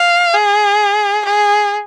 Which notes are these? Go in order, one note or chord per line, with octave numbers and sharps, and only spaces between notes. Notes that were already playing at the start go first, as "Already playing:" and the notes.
Already playing: F5
G#4
G#4